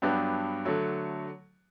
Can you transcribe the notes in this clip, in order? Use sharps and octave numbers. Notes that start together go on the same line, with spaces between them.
G2 F#3 B3 D4 G4
D3 F#3 A3